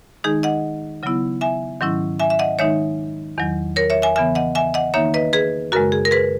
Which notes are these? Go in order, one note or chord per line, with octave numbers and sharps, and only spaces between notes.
D#3 G#3 D#4 G#4
D#5 F#5
C#3 F#3 B3 E4
E5 G#5
G#2 D#3 F#3 C#4 E4
E5 G#5
E5
D#5 F#5
D#3 G#3 D#4 C#5 E5
E2 D#3 F#3
A#4 C#5
C#5 E5
E5 G#5
C#3 E3 B3 E5 G#5
D#5 F#5
E5 G#5
D#5 F#5
D#3 A#3 D#4 C#5 E5
B4 D#5
G#4 B4
F#2 C#3 G#3 F#4 A#4
G#4
A#4
G#4 B4